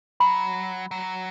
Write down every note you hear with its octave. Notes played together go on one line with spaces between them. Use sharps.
F#3 B5
F#3